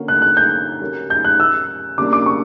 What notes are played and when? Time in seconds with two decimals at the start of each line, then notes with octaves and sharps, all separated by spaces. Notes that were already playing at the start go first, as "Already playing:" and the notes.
Already playing: D3 A#3 C#4 F#4
0.08 F#6
0.22 F#6
0.37 G6
0.81 C#3 G3 C#4 F#4 A#4
1.10 G6
1.24 F#6
1.40 E6
1.98 C#3 G3 A#3 D4 D6
2.13 D6
2.26 C#6